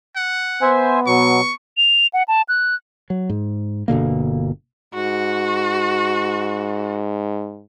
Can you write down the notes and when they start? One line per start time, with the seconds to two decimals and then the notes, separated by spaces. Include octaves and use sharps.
0.16 F#5
0.62 B3 C5 E5 G#5
1.07 B2 F#3 C#6
1.77 F7
2.13 F#5
2.28 A5
2.49 F#6
3.10 F#3
3.30 G#2
3.88 G1 B2 D3 A#3
4.94 G#2 F#4